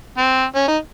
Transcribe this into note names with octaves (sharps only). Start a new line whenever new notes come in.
C4
C#4
D#4